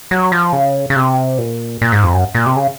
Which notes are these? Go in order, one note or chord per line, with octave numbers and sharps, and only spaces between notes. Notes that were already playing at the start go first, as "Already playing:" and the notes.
F#3
F3
C#3
C#3
C3
A#2
A#2
G#2
F2
F#2
A#2
C3
C#3